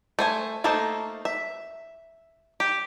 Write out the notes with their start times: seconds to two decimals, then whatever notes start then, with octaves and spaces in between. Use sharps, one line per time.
0.19 A3 C5 G#5
0.64 A3 A#3 D#4 A4 C5
1.25 E5
2.60 G4